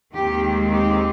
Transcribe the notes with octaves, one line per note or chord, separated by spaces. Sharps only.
D#2 D#3 G#3 C4 G4
G4